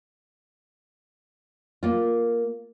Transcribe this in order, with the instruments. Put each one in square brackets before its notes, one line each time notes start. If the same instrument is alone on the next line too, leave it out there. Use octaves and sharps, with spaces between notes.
[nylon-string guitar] A#3 F4